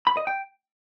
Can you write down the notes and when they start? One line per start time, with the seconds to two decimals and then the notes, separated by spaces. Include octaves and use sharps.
0.07 B5
0.17 D#5
0.27 G5